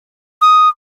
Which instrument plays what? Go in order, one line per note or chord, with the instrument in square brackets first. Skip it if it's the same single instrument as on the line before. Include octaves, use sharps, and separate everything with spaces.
[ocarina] D#6